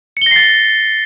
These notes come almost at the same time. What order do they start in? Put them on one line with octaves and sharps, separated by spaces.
C#7 G7 A#6 C7 A6